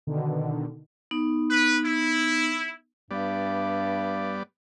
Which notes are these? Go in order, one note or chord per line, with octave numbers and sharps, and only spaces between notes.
B2 D3 D#3
B3 D#4
B4
E4
G2 G3 B3 D5